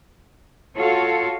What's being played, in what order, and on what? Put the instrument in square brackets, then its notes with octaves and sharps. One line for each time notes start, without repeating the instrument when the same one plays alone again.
[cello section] F4 F#4 A4 C#5 F5